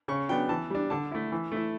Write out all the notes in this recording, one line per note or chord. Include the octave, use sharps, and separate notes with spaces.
C#3 C#6
F#3 B3 D4 G5
E3 A5
G3 D4
D3 A5
A3 E4
E3
A3 E4